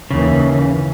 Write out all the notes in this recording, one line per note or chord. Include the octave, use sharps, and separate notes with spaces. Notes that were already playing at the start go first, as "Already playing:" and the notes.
D#2 C#3 E3